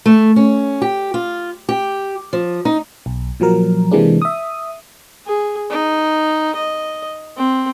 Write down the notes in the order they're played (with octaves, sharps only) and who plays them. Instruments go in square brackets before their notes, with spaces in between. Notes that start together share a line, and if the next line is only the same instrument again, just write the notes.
[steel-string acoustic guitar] A3
C#4
G4
F4
G4
F3
D#4
[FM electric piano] B1
A#2 F3 F#3 A#4
C3 E3 G#3 A#3 D4
E5 D#6
[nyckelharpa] G#4
D#4
D#5
C4